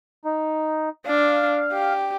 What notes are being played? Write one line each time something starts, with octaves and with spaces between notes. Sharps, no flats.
D#4
D4 F5
G4